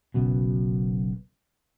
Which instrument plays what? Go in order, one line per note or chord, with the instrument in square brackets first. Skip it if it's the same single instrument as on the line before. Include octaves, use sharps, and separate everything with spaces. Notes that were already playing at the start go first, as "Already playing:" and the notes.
[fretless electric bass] F#1 B1 F#2 B2